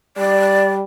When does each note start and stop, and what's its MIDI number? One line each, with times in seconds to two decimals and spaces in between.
0.17 0.83 55
0.17 0.72 74